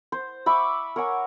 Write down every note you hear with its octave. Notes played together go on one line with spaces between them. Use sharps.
C5
E5 B5 C#6 D6
A#4 C#5 F#5 G#5